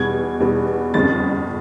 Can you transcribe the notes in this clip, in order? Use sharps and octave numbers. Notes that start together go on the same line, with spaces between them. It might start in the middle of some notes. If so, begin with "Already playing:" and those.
Already playing: E2 B2 G3 B3 G#6
E2 B2 G3 B3
G1 F2 C#3 A6